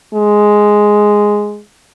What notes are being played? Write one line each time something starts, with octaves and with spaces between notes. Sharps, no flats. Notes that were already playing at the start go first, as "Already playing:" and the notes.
G#3